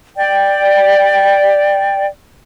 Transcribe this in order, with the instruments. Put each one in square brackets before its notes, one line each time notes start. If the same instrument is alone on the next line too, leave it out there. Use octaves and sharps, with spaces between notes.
[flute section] D5 G5